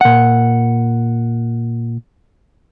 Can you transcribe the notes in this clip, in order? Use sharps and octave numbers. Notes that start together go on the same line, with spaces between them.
A#2 F#5